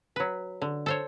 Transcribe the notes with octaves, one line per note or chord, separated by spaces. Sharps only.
F#3 B4
D3
A4 C5 C#5